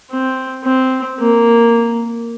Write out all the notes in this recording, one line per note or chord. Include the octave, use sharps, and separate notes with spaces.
C4
C4
A#3